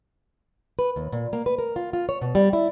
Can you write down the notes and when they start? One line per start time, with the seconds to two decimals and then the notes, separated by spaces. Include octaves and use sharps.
0.79 B4
0.96 D#2
1.12 A#2
1.33 A#3
1.46 B4
1.59 A#4
1.76 F4
1.93 F4
2.09 C#5
2.21 B2
2.35 G3
2.53 E4